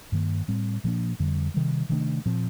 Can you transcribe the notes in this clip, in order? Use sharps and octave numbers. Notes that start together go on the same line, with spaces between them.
G2 D#3 A#3
A2 G3 C4
A#2 F3 A#3 D4
F2 D3 G3
C3 D#3 G3
C3 D#3 A3 D4
A#2 F3 C4